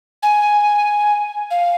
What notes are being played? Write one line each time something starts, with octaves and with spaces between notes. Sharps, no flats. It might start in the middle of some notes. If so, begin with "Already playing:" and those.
G#5
F5